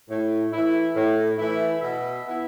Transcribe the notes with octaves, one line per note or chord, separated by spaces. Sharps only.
A2
E3 A3 E4
A2
E3 A3 E4
B2 E5
B3
E4